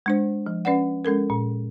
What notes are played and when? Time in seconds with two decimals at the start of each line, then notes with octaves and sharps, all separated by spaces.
0.06 G#3 D4 C5
0.46 F3
0.65 C#4 B4 D5 F#5
1.05 G#3 C#4 A4 A#4
1.30 A#2